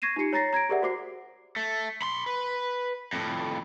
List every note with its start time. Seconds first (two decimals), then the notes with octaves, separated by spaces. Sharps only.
0.02 C#6 G#6 A#6 C7 D#7 E7
0.16 D#4 F4 G4 C7 C#7
0.33 C#5 A#5 A6 A#6 C7
0.53 A#5 G#6 A#6 D7
0.69 G4 G#4 A#4 D5 E5 F#5
0.82 F#4 C5 D6 C7
1.56 A3
2.02 B5 C6
2.26 B4
3.13 F2 A2